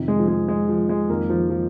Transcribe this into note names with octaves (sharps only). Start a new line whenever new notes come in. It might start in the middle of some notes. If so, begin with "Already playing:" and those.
Already playing: F2 C3 D#3
G#3
F3
G#3
G#3
F3
G#3
F2 D#3 A#3
F3
F3